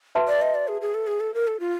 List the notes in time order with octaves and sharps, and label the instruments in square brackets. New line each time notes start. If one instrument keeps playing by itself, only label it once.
[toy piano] F#4 B4 E5 A5 C6
[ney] D5
D#5
D5
G#4
G#4
A4
G#4
A4
A#4
A4
F4